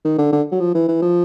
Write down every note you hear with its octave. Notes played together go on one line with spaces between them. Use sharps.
D#3
D3
D3
F#3
F3
E3
E3
F3